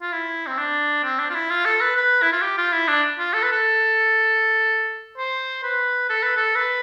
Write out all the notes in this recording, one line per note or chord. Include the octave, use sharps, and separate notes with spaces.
F4
E4
C4
D4
C4
D4
F4
E4
F4
A4
B4
B4
E4
F4
G4
F4
E4
D4
F4
A4
B4
A4
C5
B4
A4
B4
A4
B4